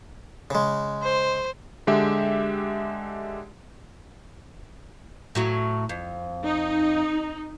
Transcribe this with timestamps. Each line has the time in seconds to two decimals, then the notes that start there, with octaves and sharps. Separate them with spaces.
0.51 C#3 G#3
1.03 C5
1.87 D3 G#3 G4 E5
5.35 A2 F#3 F#4
5.89 F2
6.43 D#4